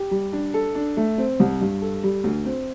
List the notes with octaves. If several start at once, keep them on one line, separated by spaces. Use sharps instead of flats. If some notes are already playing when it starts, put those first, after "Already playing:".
Already playing: G4
G3
D4
A4
D4
A3
C4
C2
G2
A4
G3
D2
C4